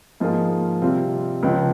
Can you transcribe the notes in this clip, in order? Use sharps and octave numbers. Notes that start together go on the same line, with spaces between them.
G#2 F3 A#3 F4 G#4
C3 G3 C4 F4
C#2 C#3 F3